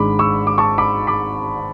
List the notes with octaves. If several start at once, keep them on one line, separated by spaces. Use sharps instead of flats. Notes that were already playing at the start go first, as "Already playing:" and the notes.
Already playing: G#1 G#2 G#3 D4 B5 D6
C#6 E6
D6
A5 C#6
B5 D6
B5 D6